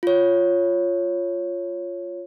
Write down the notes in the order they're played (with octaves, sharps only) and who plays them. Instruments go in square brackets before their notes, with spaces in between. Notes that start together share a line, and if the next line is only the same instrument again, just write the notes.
[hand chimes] F4 C#5